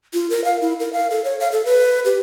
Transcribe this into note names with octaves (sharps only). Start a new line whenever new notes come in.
F4
A#4
F5
E4
A#4
F5
A4
C#5
F5
A4
B4
G4